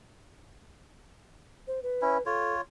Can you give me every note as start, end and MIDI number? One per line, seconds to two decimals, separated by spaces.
1.67 1.80 72
1.83 2.24 71
2.02 2.18 61
2.02 2.18 64
2.26 2.61 65
2.26 2.54 69
2.26 2.61 73